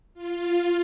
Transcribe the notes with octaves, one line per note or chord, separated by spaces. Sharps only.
F4